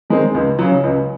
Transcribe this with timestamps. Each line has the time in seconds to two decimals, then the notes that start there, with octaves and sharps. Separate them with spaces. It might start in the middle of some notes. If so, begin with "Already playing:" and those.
0.10 D#3 G#3 C4
0.34 C#2
0.59 C#3 F#3
0.84 C#2